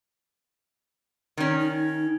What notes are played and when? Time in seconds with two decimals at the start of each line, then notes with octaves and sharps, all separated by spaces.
1.37 D#3 C#4
1.60 D#4